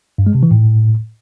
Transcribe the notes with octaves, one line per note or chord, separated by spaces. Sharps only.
G2
G#3
C3
E3
A2